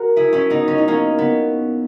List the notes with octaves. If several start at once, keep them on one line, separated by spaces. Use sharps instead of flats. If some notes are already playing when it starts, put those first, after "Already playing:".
Already playing: F#4 A#4
E4 G#4
C#4 E4
B3 D#4
C#4
D#4
A#3 C#4
B3